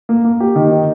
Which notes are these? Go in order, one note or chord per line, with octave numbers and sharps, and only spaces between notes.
A#3
A#3
G4
D#3
D#4